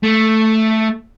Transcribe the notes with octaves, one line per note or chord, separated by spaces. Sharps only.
A3